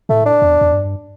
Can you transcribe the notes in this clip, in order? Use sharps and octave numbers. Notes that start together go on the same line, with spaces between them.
A2 A3
D4
E2
E2
G2